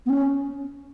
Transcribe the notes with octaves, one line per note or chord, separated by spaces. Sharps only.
B3
C#4